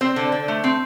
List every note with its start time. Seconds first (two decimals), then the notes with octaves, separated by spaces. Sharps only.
0.01 C4 C5
0.16 D3
0.32 D3
0.48 A3
0.64 C4